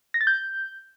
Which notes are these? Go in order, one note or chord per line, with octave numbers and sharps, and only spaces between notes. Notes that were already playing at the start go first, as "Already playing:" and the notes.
A#6
A6
G6